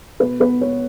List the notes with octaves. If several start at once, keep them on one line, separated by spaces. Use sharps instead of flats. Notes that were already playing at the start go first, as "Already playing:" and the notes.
B2 B4
B3 B4
B3 C#5